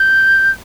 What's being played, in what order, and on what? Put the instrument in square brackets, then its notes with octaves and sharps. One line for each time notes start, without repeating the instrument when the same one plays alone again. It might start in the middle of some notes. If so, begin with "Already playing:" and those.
Already playing: [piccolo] G6